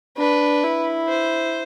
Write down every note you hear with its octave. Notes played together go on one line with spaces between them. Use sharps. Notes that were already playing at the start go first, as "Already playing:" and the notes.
D4 B4
E4
C5